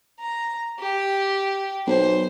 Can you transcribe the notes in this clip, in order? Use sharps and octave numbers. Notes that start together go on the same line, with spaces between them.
A#5
G4
B1 C5